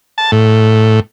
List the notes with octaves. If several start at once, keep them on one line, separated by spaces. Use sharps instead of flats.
A5
A2